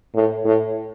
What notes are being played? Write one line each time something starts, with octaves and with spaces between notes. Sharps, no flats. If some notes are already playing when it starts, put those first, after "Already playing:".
A2
A2